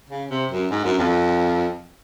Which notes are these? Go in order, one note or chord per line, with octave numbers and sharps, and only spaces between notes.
C#3
C3
F#2
G#2
F#2
F2